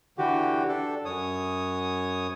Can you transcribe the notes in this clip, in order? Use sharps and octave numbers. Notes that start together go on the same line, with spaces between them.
D3 E3 F#4 G4
D4 A4
F#2 C#5 D#6